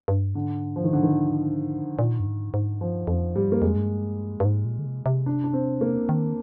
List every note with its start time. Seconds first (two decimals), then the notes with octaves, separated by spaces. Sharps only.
0.08 G2
0.35 G#2 D3
0.76 F3
0.84 D#3
0.93 D3
1.03 D#3
1.99 A#2
2.20 G2
2.26 G#2
2.54 G#2
2.80 G2 F3
3.07 F2 F3
3.35 G#2 G3
3.48 G2 A#3
3.62 F2 G#3
3.76 G2
4.40 G2
4.45 G#2
4.65 A#2
4.79 D3
4.86 C3
5.06 C3
5.26 D4
5.44 D4
5.53 C4
5.81 A#3
6.09 D#3